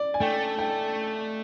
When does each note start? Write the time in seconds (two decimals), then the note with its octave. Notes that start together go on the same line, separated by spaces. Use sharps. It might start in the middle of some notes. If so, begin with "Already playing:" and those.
Already playing: D5
0.14 G#5
0.20 A3 G5
0.59 G5